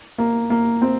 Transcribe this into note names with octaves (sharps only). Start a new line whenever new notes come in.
A#3
A#3
C4